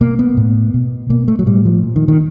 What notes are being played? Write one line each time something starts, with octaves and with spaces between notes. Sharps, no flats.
B2 A#3
B3
A2
B2
B2 A#3
A3
F#3
A2 G3
F3
A#2
D#3
D#3